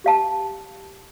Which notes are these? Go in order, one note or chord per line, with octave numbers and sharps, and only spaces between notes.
G4 F5 A5